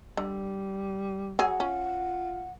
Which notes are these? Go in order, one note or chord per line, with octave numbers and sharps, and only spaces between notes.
D3 G3
F#3 G#4 F#5
C#4 F4